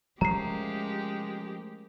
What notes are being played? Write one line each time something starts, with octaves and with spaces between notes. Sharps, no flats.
F3 G#3 A3 C#4 G4 A#4 A#5 C7